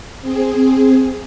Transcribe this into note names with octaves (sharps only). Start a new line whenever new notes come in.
C4 G#4